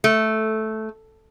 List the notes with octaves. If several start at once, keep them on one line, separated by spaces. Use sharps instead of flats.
A3